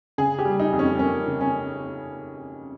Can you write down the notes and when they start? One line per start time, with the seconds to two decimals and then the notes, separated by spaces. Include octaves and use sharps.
0.18 C#3 G#4
0.39 G4
0.45 G3
0.60 D#4
0.72 F2
0.79 C#4
0.99 A#3 C#4
1.27 C#3
1.41 C#4